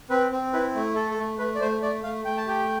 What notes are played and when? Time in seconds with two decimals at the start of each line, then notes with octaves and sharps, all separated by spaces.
0.10 C4 B4
0.32 C4
0.53 E4 B4
0.75 A3
0.95 A4
1.11 A4
1.18 A3
1.39 A3 B4
1.55 D5
1.60 A3 C5
1.82 A3 D5
2.03 A3 F5
2.25 A3 G5
2.37 A5
2.47 G4 G5